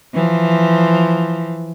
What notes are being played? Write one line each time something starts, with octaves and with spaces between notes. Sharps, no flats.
E3 F3